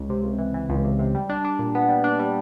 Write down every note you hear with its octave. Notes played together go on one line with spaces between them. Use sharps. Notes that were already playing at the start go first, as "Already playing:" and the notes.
Already playing: C#2
C3
C#2
E3
E3
C#2
C3
C3
G3
D4
D4
A#2
B3
G3
D4
G3